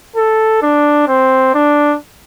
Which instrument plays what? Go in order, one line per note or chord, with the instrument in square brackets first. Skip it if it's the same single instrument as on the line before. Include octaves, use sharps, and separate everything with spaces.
[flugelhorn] A4
D4
C4
D4